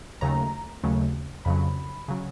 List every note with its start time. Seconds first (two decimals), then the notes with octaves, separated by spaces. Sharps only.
0.21 D#2 C#3 F#3 A3 A#5
0.83 D#2 C#3 F#3 A3
1.45 F2 C#3 F#3 B5
2.08 C#3 F#3